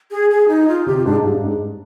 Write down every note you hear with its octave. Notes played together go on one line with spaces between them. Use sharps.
G#4
G#4
D#4
F4
C3 G4
F4
G#2 D4
G#2
G2
G#2